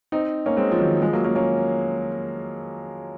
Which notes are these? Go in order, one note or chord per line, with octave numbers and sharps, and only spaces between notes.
C4 D#4
A#3 C#4
G#3 C4
F3
D#3 F#3
F3 G#3
F#3 A#3
A#3 C#4
A#3 C#4